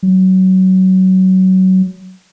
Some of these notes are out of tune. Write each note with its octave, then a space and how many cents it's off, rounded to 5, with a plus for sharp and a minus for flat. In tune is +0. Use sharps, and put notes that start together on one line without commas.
F#3 +20